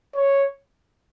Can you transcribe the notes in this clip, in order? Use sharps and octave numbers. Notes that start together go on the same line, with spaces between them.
C#5